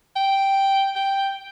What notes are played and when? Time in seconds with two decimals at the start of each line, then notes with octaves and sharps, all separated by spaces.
0.16 G5
0.95 G5